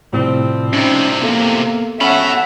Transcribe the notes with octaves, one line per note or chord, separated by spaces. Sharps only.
A2 C3 F3 G3 C4
A2 C3 C#4 D#4
A#3 B3 A4
C#4 E5 F#5 A5 B5